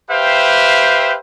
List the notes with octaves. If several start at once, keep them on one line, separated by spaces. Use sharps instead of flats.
G4 B4 C5 E5 F5 G5